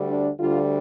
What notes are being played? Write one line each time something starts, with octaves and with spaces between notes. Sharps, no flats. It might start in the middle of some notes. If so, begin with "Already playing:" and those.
Already playing: D2 D3 G3
D4
D2 D3 G3 F4